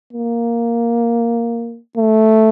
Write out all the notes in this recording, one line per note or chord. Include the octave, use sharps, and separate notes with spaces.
A#3
A3